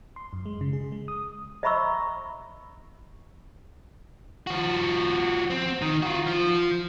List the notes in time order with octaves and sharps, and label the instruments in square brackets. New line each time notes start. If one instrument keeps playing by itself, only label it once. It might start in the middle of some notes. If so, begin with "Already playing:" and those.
[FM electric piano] C6
F#2
G#3
C#3
G#4
G#3
D#6
[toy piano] D#5 E5 A#5 B5 C#6 E6
[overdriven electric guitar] F3 F#4
C4
D#3
F4 F#4
F3